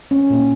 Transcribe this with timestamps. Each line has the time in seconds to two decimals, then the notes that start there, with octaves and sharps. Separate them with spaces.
0.11 C#4
0.30 A#2 G3 A#3